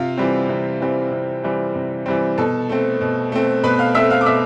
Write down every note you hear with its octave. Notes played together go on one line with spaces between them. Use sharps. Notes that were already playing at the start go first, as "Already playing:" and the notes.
Already playing: C3 F4 F5
E3 G3 C4
C3
E3 G3 C4
C3
E3 G3 C4
C3
E3 G3 C4
B2 A4 A5
A3 C4
B2
A3 C4
B2 B4 B5
F5 F6
A3 C4 E5 E6
F5 F6
D6
B2 E5 E6